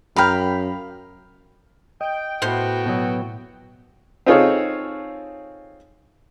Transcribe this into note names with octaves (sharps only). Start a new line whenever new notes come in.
F#2 F5 G5 A#5 B5 F6
D#5 G5
A2 B3 F#4 C5 G5
B2 F#3
C4 D#4 F4 G#4 A4 C#5